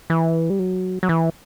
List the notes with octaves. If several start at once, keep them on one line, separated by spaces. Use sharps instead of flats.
E3
G3
F#3
F#3
E3